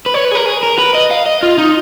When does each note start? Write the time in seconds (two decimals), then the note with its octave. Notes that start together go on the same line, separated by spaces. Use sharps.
0.06 B4
0.14 C#5
0.25 B4
0.31 G#4
0.35 A#4
0.46 G#4
0.63 A#4
0.78 B4
0.95 D#5
1.11 F5
1.26 D#5
1.43 F4
1.58 D#4